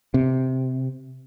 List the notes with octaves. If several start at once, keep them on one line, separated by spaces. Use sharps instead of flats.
C3